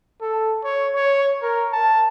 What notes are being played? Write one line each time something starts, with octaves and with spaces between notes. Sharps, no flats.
A4
C#5
C#5
A#4
A5